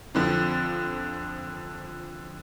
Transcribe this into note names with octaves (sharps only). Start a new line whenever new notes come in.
F2 D3 F3